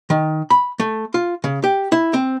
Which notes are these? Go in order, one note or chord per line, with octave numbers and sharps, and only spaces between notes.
D#3
B5
A3
F4
C#3
G4
E4
C4